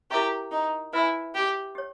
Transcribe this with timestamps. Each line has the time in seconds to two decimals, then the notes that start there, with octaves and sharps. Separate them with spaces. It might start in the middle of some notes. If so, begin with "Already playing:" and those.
0.11 E4 G4 A#4 E5 A#5 C#6
0.52 D#4
0.93 E4 B4 E5 G#5 B5
1.35 G4
1.75 G4 C#5